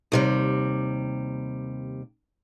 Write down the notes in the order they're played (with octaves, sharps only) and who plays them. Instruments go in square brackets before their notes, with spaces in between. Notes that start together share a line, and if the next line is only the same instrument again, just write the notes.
[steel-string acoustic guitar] D#2 C3 G3